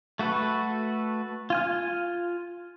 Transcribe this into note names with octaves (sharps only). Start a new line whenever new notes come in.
A3 F#4 A4 B4
F4 G#5 F6